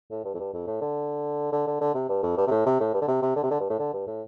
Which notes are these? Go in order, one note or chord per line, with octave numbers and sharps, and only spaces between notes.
A2
G2
F2
G2
F2
A2
D3
D3
D3
D3
C3
G2
F2
G2
C3
A2
C3
A2
G2
D3
C3
C3
D3
C3
D3
G2
A2
D3
G2
A2